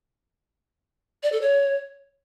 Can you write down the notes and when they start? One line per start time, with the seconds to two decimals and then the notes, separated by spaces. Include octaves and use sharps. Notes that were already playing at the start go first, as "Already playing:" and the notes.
1.23 D5
1.32 A4
1.42 C#5